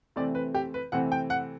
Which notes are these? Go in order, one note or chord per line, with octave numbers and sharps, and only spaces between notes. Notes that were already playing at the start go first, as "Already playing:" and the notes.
C3 E3 A3 C4 D5
B4
G4
B4
C3 E3 A3 C4 F#5
G5
F#5